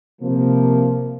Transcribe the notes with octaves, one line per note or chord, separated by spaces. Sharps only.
C3 F3 A#3